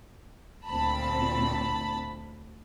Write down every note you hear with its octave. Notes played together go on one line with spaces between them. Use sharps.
D2 A#2 C4 A5 B5